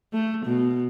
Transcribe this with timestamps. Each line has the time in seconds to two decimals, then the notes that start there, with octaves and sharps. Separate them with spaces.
0.13 A3
0.46 B2